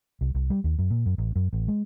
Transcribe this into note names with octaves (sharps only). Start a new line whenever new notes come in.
C2
C2
G3
D#2
F#2
A#2
F#2
A1
F#2
A1
G#3